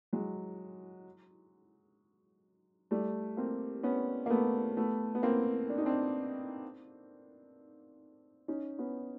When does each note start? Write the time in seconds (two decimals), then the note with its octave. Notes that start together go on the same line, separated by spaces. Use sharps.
0.13 F#3 G#3
2.91 G3 A3
3.37 A#3 C4
3.83 B3 C#4
4.26 A#3
4.30 A3 B3
4.77 A3 B3
5.15 B3
5.23 A#3 C4
5.69 D4
5.78 D#4
5.86 C4 D4
8.48 C#4 D#4
8.79 B3 C#4